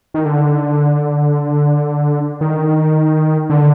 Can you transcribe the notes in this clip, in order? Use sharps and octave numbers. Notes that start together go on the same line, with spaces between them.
D#3
D3
D#3
D3